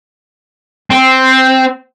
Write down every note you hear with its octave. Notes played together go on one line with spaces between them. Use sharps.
C4